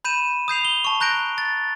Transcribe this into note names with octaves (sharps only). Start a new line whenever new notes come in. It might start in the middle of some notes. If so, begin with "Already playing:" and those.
B5 G6 D#7 E7
D#6 G6 C7 F7
G7
A5 C#6
A#5 F#6 G6 A#6 D7
A6